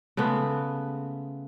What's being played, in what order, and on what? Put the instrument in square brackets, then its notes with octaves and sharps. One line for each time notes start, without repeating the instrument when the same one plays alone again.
[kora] C#3 G#3 A3 B3